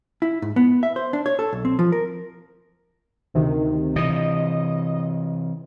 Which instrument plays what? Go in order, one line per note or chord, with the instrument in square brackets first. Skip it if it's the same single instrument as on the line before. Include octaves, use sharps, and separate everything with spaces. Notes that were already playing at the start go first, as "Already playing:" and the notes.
[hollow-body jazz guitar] E4
G#2
B3
E5
C5
D4
C#5
A4
B1
C4
F3
A#4
[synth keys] D2 C3 D#3
[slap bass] C3 E3 [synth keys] D#5